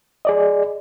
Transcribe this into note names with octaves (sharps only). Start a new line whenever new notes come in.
G#4 D5 D#5